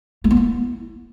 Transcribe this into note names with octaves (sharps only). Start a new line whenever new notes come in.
A3
B3
E4